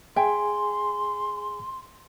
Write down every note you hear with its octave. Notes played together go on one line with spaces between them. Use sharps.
G#4 E5 G5 G#5 C6